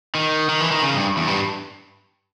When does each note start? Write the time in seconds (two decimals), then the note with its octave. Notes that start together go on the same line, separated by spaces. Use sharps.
0.15 D#3
0.49 D#3
0.60 E3
0.71 D#3
0.82 C#3
0.94 G2
1.17 E2
1.27 G2